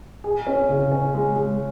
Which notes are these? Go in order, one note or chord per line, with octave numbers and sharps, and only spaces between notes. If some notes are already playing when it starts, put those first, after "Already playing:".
G#4
C#4
C#3
C#4
G#3
G#3